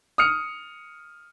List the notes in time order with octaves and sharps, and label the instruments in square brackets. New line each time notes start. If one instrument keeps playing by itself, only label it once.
[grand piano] D#6 F6 C#7